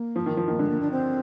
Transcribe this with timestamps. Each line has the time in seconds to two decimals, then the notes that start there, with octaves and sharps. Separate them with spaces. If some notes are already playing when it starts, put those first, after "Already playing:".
Already playing: A#3
0.16 F3
0.26 D#3
0.37 F3
0.48 D#3 A#3
0.59 D3 G#3
0.69 A#3
0.80 D4
0.91 C4